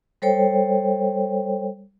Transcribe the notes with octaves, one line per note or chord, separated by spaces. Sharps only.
G3 A4 C5 C#5 G5